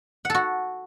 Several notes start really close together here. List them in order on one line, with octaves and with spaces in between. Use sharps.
F#5 A4 F#4